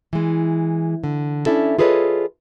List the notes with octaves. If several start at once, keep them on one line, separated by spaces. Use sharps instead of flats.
E3 G#3
D3
C#4 D4 E4 A4
F4 G#4 A4 B4 C#5 D#5